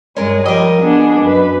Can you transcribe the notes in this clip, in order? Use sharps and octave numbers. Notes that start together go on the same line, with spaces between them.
G2 G#3 C#4 A#4
F3 G3 A#4 D#5
B3 D4 G#4
F#2 B4